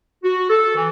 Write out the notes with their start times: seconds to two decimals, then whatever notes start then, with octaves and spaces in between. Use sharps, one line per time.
0.24 F#4
0.50 A4
0.75 E3